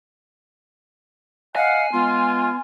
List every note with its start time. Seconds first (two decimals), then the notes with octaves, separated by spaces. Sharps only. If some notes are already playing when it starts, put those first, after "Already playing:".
1.56 D#5 F5 F#5 G#5
1.92 G#3 B3 F4 C6